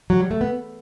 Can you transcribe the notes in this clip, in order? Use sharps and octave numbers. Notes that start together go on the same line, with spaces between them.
F#3
G3
A3
B3